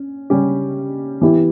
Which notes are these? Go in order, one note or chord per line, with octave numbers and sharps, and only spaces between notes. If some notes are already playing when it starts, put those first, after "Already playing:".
Already playing: C#4
C#3 G3 C#4 G4
E3 B3 E4 G4